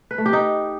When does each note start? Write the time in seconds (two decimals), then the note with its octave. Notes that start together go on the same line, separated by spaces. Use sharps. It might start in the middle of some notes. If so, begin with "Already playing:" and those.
0.11 B4
0.18 A3
0.26 G4
0.33 D#4